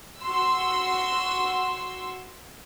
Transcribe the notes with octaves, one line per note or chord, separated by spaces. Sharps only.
F#4 C6 E6